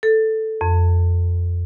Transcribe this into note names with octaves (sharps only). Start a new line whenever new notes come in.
A4
F2